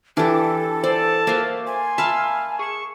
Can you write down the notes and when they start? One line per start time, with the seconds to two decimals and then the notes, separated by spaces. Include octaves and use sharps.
0.17 E3 D4 G4 A4 A5
0.84 C5 D5 A5
1.27 A#3 F#4 C5 E5 F5
1.67 G#5 C6
1.98 E5 F5 A5 B5 F6
2.59 G#4 C#6 E7